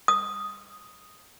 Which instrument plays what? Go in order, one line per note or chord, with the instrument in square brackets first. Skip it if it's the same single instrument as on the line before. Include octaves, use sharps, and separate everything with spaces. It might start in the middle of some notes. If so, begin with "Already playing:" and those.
[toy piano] D#6